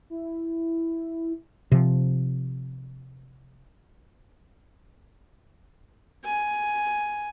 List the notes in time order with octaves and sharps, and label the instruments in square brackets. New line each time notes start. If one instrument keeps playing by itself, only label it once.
[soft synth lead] E4
[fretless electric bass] C3 F3
[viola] G#5